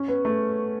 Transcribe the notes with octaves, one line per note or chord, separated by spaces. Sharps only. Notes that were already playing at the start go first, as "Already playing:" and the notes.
Already playing: C#4
B3
A3